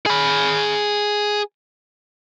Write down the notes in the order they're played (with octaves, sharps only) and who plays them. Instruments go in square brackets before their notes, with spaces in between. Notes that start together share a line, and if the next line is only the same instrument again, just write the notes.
[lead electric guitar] G#4 B5